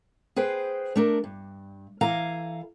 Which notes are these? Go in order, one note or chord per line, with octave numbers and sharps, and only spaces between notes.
G#4 B4 C5 G5
A3 D4 A#4
G2
E3 A4 F5 G#5 A#5